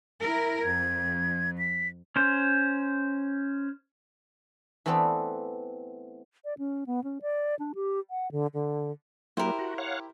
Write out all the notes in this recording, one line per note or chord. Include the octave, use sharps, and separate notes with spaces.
E4 A#4
F2 G#6
B6
C#4 C5
E3 A3 B3 C4 B4 D5
D5
C#4
B3
C#4
D5
D4
G4
F#5
D3
D3
F#3 A#3 E4 G4 A#4 C5
F#4
C#5 F5 F#5